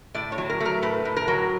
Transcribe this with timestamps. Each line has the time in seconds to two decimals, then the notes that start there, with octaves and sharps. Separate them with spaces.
0.14 A2 D5
0.32 C#5
0.38 F#3
0.50 A#4
0.60 A3
0.65 A#4
0.83 A2 B4
1.05 A2
1.16 A#4
1.28 F#3